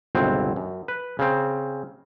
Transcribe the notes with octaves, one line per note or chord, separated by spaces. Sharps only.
G1 C#2 B2 F#3 C4
F#2
B4
C#3 C4